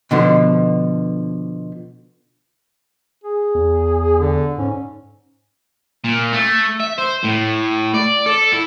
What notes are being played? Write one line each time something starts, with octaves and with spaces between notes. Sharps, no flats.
B2 D3 F3
G#4
E2
D3
G#2 C#4
A#2
A3
E5
C5
A2
D5
A4
E4